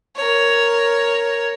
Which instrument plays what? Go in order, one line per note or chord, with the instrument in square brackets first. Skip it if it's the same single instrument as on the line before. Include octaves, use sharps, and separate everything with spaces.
[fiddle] A#4 C#5